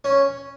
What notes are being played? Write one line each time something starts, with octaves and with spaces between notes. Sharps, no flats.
C#4